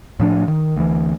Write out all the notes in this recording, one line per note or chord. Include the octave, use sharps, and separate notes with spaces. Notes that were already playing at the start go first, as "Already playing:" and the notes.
A2 F3 D4
D#3
D2 E3